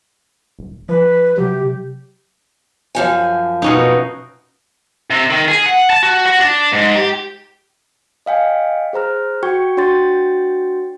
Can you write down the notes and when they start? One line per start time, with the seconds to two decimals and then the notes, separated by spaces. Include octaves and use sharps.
0.59 D#1
0.89 F3 B4
1.38 C3 F#3 G4
2.95 F#2 F3 G#5
3.62 B2 C#4 D#4
5.10 C3
5.30 D#3
5.48 G#4
5.66 F#5
5.90 A5
6.03 F#4
6.26 F#4
6.40 D4
6.72 G#2
6.95 G4
8.26 D#5 F5 G5 G#5
8.93 G#4 C5 A#5 F6
9.43 F#4 G5 C#6 G#6
9.77 D4 F#4 C#5 G5 C6 A6